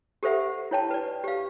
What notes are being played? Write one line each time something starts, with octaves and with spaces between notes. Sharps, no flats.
G4 A4 C5 E5 F#5
E4 C#5 G5 A5
B4 D5
G4 F5